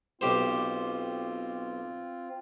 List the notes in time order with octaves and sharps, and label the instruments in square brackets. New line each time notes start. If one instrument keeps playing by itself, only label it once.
[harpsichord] B1 G4 C5 [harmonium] C4 F4